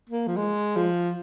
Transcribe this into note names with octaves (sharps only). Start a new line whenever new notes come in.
A#3
F3
G#3
F3